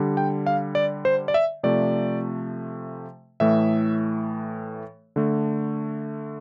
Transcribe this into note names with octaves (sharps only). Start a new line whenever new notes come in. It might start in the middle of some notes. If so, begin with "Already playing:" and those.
Already playing: D3 G3
G5
F5
D5
C5
D5
E5
C3 F3 A3 D5
A2 E3 A3 E5
D3 A3